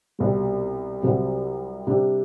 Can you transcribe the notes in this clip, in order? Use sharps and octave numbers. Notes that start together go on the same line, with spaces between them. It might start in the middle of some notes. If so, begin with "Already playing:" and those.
C2 B2 G3
C2 C3 F#3 C4
C3 G3 D4